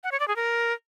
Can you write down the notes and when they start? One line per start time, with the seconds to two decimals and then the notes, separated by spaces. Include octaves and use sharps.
0.04 F#5
0.12 C#5
0.20 D5
0.28 G#4
0.36 A#4